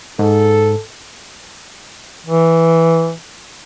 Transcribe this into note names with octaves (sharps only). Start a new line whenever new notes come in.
G#2 A4
E3